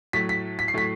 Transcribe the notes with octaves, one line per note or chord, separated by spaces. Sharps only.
A2 F#3 A3 B6
B6
B6
C7
A2 F#3 A3 B6